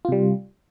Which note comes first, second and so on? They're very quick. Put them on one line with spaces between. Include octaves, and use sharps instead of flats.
F4 C3 G3